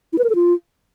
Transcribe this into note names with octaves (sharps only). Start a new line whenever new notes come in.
E4
B4
A#4
A4
F4